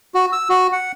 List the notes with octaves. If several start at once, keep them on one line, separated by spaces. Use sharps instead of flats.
F#4
E6
F#4
F#5